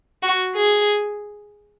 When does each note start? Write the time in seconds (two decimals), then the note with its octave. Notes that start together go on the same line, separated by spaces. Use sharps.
0.23 F#4
0.56 G#4